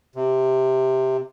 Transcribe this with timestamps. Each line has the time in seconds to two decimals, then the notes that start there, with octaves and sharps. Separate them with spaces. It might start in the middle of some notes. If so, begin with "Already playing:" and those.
0.15 C3